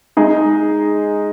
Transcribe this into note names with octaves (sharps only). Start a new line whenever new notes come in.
G#3 D#4 G#4